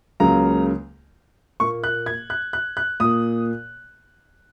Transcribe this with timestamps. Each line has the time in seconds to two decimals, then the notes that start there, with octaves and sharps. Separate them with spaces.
0.20 C#2 C#3 F#3 A#3 A#5
1.60 A#2 A#3 C#6
1.84 F#6
2.06 G#6
2.30 F#6
2.53 F#6
2.77 F#6
3.00 A#2 A#3 D#6